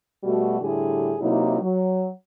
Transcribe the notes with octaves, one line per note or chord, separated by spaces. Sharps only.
B2 G3 A3 F#4
A2 D3 G3 E4 G4 G#4
C3 F#3 A#3 D#4 E4
F#3